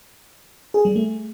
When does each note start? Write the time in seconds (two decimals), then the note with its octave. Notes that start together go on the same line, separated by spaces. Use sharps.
0.74 G#4
0.85 G3
0.96 A3